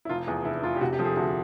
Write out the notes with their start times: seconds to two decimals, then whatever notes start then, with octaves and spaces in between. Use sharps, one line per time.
0.05 E4
0.09 F1 F4
0.27 E2 G#4
0.45 F1 E4
0.63 F1 F4
0.76 G4
0.81 C3 F#4
0.93 G4
0.99 F3 A4
1.05 G#4
1.16 D2 F#4